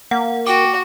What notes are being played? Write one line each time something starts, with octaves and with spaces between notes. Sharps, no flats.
A#3 F#5
F#4 G5 D6